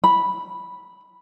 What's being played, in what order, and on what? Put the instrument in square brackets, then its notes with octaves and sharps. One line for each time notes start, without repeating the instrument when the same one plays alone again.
[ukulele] B5